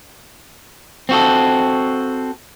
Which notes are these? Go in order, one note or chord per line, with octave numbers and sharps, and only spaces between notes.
C4 F#4 A4